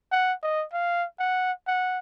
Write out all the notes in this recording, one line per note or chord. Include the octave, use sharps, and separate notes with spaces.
F#5
D#5
F5
F#5
F#5